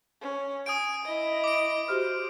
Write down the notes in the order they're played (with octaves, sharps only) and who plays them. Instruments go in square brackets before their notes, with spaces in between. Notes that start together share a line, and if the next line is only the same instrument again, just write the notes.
[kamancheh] C#4
[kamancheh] G#5 [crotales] D#6 D7
[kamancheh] E4 D#5
[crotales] D6 D7
[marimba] F#4 G4 F6 [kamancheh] C5